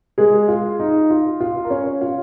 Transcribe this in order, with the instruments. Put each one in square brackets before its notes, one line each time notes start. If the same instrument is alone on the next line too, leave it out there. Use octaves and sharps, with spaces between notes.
[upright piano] G#3 G#4
F4
D#4
F4
F4
A#4
C#4 C#5
F4 F5